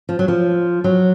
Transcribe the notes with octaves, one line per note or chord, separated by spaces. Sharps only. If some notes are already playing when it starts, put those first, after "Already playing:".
F3
F#3
F3
F#3